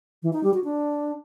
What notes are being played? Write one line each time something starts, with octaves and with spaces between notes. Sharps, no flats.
E3
D#4
G3
F#4
D4